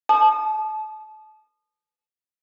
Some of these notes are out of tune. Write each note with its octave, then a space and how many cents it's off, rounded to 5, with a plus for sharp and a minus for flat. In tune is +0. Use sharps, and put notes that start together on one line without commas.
A5 -30 D#6 -30